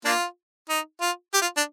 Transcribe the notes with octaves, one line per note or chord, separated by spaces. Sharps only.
A#3 D4 F4
D#4
F4
G4
F4
D4